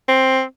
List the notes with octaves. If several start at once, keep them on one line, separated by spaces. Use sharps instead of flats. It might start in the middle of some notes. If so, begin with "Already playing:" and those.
C4